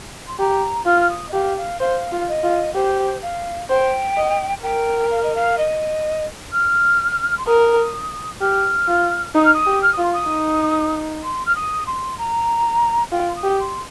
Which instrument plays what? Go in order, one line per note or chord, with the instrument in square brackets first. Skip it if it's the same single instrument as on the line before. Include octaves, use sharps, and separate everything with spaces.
[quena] C6
[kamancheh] G4 [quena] A#5
[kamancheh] F4 [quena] F6
[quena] F6
D#6
D#5
[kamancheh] G4 [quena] F5
[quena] F5
[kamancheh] C5 [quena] F5
[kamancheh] F4
[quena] D#5
[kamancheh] F4
[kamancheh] G4 [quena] C5
[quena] F5
[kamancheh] C5 [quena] G5
[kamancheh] D#5
[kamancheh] A#4 [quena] G5
[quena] F5
D#5
F5
D#5
F6
C6
[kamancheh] A#4 [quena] D#6
[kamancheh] G4 [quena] F6
[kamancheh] F4
[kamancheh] D#4 [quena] D#6
[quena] F6
D#6
[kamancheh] G4
[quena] F6
[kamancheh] F4 [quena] D#6
[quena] C6
D#6
[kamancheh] D#4
[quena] C6
F6
D#6
C6
A#5
[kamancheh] F4 [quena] G5
[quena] C6
D#6
[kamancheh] G4
[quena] C6